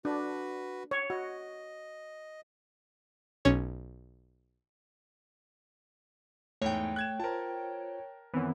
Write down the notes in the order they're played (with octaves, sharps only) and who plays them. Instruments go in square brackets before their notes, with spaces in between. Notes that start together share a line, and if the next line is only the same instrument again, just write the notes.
[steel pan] D4 [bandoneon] F#4 B4
[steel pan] C#5
[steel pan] F#4 [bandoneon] D#5
[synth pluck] B1 C#4 C#5
[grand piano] E2 G#2 [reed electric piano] A3 [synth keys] C#5 G5
[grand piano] F#6 G#6 E7
[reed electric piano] F4 C5 [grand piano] A#4 A5
[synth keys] F#2 E3 [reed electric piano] D#3 B3 C4